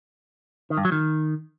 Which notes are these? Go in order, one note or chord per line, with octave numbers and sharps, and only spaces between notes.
D#3
G2
F#3
D#3